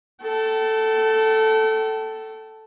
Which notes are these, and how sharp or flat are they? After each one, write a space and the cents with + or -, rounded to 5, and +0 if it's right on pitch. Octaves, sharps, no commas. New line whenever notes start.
A4 +0 G5 -40